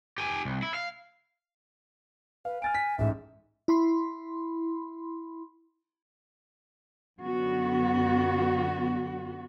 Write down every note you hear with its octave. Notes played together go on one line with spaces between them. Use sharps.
G4 G#5
C2
E4
F5
B4 F5
G#5 F6 A6 D7
B6
A1 G#2 E5
E4 B5 C6
F#2 D3 B3 F#4